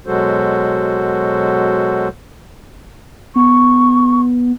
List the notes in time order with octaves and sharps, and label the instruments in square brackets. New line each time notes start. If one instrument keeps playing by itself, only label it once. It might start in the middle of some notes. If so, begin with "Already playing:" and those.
[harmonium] B2 F#3 G#3 F#4 A4 C5
[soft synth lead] B3 [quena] C#6